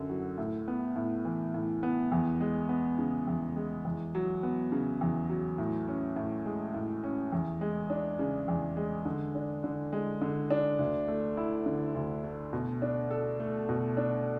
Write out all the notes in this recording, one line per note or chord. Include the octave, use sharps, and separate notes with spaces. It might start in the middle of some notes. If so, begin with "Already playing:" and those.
Already playing: F#2 D3
F#3
A2
B3
A2
E3
A2
B3
E2
G#3
B3
C#3
E2
G#3
E2
F#3
B3
C#3
E2
F#3
A2
C#4
A2
G#3
A2
C#4
E2
G#3
D4
C#3
E2
G#3
D3
D4
D3
G#3
D3
D4
D2
A3
E4
D3
D2
A3
B2
D4
A4
A3
B2
D4